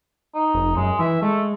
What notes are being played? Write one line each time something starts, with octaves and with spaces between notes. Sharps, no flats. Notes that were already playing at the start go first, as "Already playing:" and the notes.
D#4
F1
F#2 G#3
E3 E5
G#3 A3